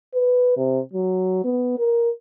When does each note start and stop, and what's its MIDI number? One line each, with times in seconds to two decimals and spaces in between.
0.14 0.52 71
0.57 0.79 48
0.94 1.41 54
1.44 1.75 59
1.78 2.09 70